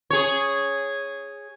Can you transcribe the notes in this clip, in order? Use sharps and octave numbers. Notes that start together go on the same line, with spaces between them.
G#4 C#5